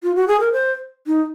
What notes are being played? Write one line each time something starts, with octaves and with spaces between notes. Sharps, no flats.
F4
F#4
G#4
A#4
C5
D#4